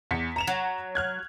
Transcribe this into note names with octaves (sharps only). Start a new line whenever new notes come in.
E2 B6 C#7
A#5 E7 F7
F#3
F6 F#6 G#6